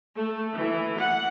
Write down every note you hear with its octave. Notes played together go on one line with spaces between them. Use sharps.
A3
E3
F#5